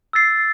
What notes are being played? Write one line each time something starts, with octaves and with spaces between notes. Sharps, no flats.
E6 A6 C7